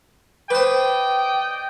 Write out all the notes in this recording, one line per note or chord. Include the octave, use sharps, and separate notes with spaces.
B4 C5 D5 D#5 G5